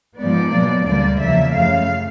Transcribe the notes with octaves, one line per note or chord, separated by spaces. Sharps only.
G#2 F3 G#3 B3 D5
B2 F#3 A#3
D2 D3 G3 A#3 D5
E2 C#3 F3 A#3 E5
F#2 C#3 F3 A3 F5